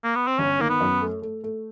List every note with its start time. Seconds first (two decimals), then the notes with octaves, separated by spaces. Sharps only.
0.04 A#3
0.16 B3
0.27 C4
0.38 G1 C#4
0.59 D#3 A#3
0.69 B3
0.80 F#2
1.01 A3
1.22 A3
1.44 A3